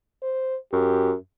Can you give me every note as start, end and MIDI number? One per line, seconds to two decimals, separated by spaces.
0.22 0.56 72
0.72 1.14 42
0.72 1.11 67